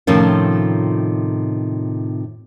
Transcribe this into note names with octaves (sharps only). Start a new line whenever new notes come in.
A2 C3 D#3 F3 C#4 F4